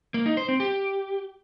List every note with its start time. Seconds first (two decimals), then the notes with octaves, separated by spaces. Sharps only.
0.14 A#3
0.26 D#4
0.37 C5
0.49 C4
0.60 G4